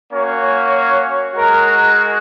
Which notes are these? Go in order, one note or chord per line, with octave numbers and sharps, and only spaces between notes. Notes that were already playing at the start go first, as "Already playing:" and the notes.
A#3 C#4 F#4 C#5
G#3 F#4 A#4